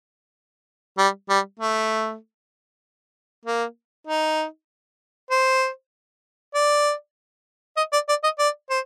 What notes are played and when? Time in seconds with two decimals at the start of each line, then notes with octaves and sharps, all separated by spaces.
0.98 G3
1.30 G3
1.60 A3
3.45 A#3
4.07 D#4
5.31 C5
6.54 D5
7.77 D#5
7.93 D5
8.09 D5
8.24 D#5
8.39 D5
8.70 C5